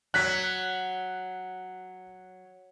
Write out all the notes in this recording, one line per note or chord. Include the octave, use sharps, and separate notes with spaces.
F#3 F#6 B6